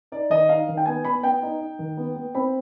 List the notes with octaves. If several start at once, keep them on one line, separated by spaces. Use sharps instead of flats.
D#4 D5
D#3 D#5
D#4 F5
D#3
G5
B3 G#5
B3 B5
B3 G5
D#4
D#4
D#3
B3
B3
C4 B5